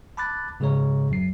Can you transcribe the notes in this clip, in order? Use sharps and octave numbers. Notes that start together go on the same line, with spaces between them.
A5 B5 D6 F#6 A6
G#2 C#3 G#3 G#4 C#5 A#5
F#2 F#3 C7